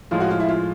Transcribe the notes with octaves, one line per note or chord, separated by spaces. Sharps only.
A2 F3 G#3 F4
F#4
F4
E4
F4